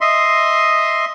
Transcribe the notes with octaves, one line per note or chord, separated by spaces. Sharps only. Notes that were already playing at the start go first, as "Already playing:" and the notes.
D#5 E5 C6